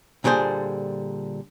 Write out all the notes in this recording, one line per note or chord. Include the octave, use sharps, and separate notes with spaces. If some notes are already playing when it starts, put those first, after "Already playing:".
A#2 D3 G3 G#4 C5